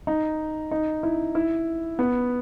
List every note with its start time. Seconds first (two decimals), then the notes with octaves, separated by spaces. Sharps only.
0.07 D#4
0.71 D#4
1.03 E4
1.35 E4
1.99 B3